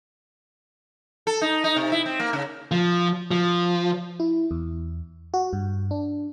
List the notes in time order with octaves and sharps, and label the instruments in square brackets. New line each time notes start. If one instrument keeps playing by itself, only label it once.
[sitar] A4
D#4
D#4
C3
E4
C4
A#3
C#3
[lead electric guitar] F3
F3
[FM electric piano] E4
E2
F#4
G2
D4